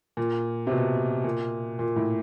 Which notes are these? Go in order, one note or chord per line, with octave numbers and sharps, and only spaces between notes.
A#2
C3
B2
A#2
A#2
A2